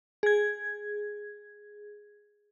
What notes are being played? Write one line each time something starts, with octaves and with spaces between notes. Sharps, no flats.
G#4 G#6